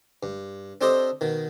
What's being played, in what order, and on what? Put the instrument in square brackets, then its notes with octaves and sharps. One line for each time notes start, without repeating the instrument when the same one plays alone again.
[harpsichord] G2
C4 D4 G4 A4 C5 D#5
B2 D#3